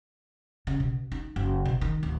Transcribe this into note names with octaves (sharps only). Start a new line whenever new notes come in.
C#3
B2
D#4
F#1
B2
D#3
D1